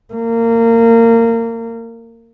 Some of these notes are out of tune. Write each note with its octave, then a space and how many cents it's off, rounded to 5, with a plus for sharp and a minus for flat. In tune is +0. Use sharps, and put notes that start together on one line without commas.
A#3 -25